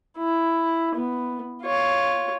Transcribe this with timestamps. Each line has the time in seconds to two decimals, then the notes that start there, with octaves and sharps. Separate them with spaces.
0.18 E4
0.96 B3
1.63 F4 C#5